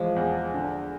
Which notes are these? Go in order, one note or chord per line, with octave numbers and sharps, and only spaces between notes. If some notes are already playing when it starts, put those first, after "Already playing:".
Already playing: E3 F3 G#3
E2
D3